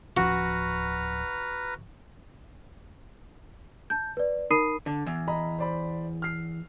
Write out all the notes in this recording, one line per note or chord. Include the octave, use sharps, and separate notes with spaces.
D1 F3 C#4 F#4 B4 A#5 F6
A5 G6
B4 D5
D#4 A#4 B5 D#6 C7 D#7
D3
E2
D#5 A#5 B5
C5 D5 B5
F6 C7